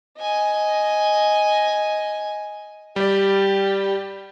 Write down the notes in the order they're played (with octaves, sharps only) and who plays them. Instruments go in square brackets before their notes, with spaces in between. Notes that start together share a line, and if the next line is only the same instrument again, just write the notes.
[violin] D#5 G#5
[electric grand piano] G3 D5 [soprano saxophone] G4